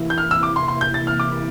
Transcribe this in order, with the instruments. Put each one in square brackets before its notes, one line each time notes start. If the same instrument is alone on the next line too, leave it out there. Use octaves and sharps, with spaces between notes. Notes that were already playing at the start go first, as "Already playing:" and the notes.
Already playing: [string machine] C3 E3 A#3 E4
[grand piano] G6
F6
E6
D6
C6
C6
G6
A6
F6
D6